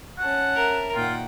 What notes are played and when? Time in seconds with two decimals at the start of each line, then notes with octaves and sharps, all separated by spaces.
0.19 C#4 F#5 A5
0.54 A#4 E5
0.95 A#2 D#3 F4 F#5 G5